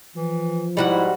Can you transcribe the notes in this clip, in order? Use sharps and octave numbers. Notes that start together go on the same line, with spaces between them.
E3 F3
G#2 G3 E4 F#4 F#5